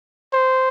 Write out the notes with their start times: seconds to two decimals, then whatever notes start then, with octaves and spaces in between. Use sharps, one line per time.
0.33 C5